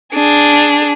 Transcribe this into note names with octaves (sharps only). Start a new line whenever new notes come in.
D4 G#4